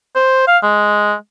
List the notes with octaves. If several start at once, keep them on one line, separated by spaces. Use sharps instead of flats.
C5
F5
G#3